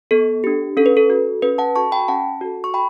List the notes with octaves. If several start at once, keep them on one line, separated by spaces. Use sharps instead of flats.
B3 A4
D4 G4
C#4 A4
B4
A4
F#4 A4
C#4 B4
F#5 A5
F#4 A4 A5 C#6
G5 B5
C#4 F#5 A5
F#4 A4
C#6
G5 B5